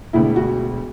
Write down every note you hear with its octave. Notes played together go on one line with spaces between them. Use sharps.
E1 D2 D3 E4
F#4